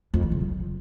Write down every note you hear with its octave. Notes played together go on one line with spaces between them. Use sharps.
F2
E3
C#3
F#3